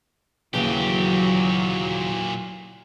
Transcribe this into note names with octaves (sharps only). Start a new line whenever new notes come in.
D#2 A#2 C#3 E3 F#3 G4